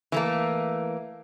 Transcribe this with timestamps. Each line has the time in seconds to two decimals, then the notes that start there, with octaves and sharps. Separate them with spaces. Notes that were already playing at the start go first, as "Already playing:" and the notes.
0.12 E3 A3 A#3